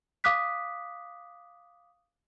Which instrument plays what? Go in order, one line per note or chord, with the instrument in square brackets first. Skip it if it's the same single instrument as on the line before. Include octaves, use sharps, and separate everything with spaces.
[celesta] F5 D6 D#6 F#6 B6